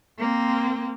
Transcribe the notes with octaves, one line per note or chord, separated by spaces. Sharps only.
A#3 C4